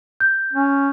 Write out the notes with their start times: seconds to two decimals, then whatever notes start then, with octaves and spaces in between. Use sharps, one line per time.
0.20 G6
0.53 C#4